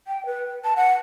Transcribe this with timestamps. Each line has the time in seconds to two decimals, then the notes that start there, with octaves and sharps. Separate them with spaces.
0.07 G5
0.26 B4
0.64 A5
0.76 F#5